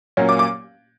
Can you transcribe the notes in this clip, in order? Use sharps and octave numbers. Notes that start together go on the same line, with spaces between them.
A#2 F#3 A#3 C#4
D6
D6